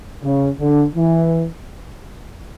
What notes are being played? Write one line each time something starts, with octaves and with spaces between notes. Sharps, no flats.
C#3
D3
E3